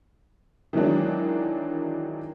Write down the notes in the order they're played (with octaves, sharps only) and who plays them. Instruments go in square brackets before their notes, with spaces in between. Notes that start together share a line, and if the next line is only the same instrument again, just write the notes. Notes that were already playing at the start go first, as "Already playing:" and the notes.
[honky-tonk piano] D#3 E3 F#3 G#3 D4